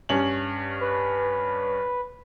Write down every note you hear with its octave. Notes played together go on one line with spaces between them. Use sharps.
G2 C#4 F#7
B4